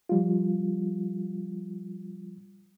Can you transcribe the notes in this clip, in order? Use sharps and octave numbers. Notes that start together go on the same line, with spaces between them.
F3 G3 F4